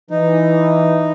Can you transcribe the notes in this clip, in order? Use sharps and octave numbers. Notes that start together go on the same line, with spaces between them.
E3 D#4